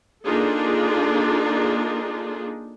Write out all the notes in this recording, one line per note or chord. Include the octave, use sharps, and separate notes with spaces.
A#3 D4 D#4 F4 G#4 A4